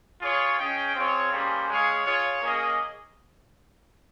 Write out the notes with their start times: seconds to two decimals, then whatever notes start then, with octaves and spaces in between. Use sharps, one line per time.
0.22 F4 G#4 C#5
0.59 C#4 G#4 D#5 G5
0.96 C4 F4 G#4 C#5
1.32 G3 A#3 C#4 G#4 C5
1.69 G#3 C#4 G#4 C#5 F5
2.06 F4 G#4 C#5
2.42 A#3 C#4 G#4 D#5